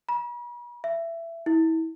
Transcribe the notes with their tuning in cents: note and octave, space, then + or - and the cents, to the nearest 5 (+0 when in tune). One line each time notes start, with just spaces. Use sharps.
B5 -45
E5 +20
E4 -30